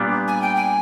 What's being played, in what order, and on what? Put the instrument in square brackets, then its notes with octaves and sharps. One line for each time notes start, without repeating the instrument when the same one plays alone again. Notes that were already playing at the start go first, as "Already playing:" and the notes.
Already playing: [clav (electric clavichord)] A#2 G3 B3 D4
[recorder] G#5
G5
G#5